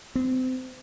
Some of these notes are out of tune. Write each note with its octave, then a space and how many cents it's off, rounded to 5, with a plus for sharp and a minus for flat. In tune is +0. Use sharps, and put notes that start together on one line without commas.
C4 -30